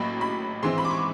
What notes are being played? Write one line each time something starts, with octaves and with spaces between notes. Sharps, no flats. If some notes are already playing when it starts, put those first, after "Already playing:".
Already playing: A1 A2 F#3 A#3 B5
B5
G#2 E3 G#3 C4 C6
B5
D6
C#6